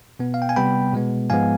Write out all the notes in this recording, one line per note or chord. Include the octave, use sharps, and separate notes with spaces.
B2 B3
F5
G5
G#5
C3 G3 B3 G5 B5
B2 G#3 B3
G#2 F3 G#3 B3 F5 G#5